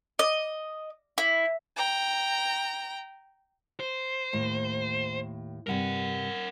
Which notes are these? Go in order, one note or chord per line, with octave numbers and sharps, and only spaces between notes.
D#5
E4
G5 A#5
C5
D#2 A2
G2 C3 G3 A#4 F#5